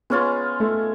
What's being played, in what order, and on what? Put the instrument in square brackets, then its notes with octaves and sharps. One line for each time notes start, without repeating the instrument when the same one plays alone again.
[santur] G#3 C#4 F4 [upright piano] B3
[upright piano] A3